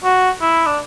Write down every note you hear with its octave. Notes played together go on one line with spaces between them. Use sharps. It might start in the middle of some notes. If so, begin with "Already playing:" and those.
F#4
E4
D4